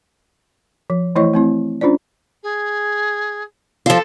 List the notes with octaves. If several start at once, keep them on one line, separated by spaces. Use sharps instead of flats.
F3
E3 A3 E4 C#5 D#5 C#6
A3 C4 E4
C#4 D4 F4 C5 D5
G#4
F3 F4 A4